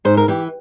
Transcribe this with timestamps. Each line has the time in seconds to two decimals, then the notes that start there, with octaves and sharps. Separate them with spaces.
0.05 G#2 C5
0.17 A#4
0.28 E3 G4